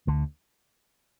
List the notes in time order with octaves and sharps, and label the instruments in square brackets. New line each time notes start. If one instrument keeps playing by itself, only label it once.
[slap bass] D2 D3